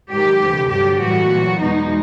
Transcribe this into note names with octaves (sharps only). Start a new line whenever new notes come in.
G#2 D#3 F#3 G4
D2 C3 E3
G2 D3 F#3 G4
A2 E3 G3 F#4
A#2 F#3
E2 B2 G#3 D#4